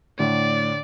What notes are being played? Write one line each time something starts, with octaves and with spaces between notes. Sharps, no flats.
A2 D3 D5